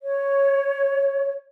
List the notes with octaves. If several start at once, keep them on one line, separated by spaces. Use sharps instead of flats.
C#5